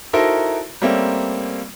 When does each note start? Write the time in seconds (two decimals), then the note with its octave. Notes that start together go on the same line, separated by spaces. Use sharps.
0.13 D#4 E4 F#4 A4 A#4 C5
0.82 G3 A3 A#3 C4 C#4